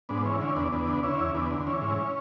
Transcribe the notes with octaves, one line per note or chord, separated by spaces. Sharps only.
G#2 B3 D4
E3 C#4
D3 C#4
E2 B3 D4
E2 B3 D4
D3
D3 C#4 E4
E2
E2 B3 D4
D3
E3 C#4
G#2 C#4